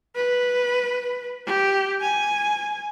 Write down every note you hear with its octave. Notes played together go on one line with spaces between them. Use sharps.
B4
G4
G#5